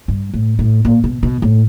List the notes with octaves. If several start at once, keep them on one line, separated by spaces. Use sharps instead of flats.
G2
A2
A2
A#2
B2
B2
A2